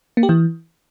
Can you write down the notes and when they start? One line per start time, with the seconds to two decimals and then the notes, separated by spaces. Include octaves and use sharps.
0.17 A#3
0.23 G4
0.29 E3